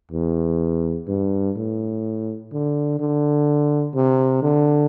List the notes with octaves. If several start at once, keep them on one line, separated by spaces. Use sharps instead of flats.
E2
G2
A2
D3
D3
C3
D3